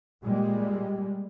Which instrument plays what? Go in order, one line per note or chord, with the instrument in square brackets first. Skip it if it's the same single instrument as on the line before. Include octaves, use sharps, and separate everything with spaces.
[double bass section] A#2 G3 G#3